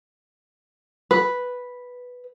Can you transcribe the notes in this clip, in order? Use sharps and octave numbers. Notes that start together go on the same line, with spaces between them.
B4